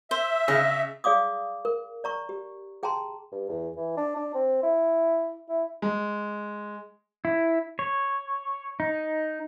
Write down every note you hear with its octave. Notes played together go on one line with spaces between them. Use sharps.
C5 E5
C#3 D#5
G#4 D5 F5 D6 D#6
A#4
D5 A#5 C#6
G4
G#4 G5 A5 A#5 C6
G2
E2
E3
D4
D4
C4
E4
E4
G#3
E4
C#5
D#4